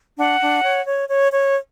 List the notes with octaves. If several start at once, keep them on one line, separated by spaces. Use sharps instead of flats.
D4 F#5
D4
C#5
C#5
C#5
C#5